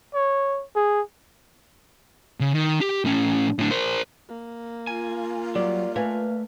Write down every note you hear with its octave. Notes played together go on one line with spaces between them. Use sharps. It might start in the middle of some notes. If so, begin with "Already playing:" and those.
C#5
G#4
C#3
D#3
G4
A2 C#4
A2 D4
A#4 C5
A#3
F4 G#5
F#3 G3 D5
A3 B4 F5 G#5